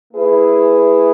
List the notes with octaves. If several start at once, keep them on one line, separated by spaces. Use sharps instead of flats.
A3 E4 G#4 B4